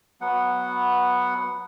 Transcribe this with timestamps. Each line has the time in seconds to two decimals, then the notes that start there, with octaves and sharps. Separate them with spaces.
0.21 F#3 B3 F#5